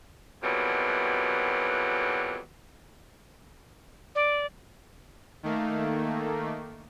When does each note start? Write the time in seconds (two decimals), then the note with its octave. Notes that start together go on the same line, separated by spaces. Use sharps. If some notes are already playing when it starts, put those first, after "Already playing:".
0.41 F2 B2 E3 F#3 G3 A#3
4.15 D5
5.43 D#3 A3 A#3